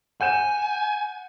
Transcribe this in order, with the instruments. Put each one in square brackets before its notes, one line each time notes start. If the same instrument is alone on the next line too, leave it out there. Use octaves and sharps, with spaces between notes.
[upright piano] F#5 G6 E7 [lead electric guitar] G#5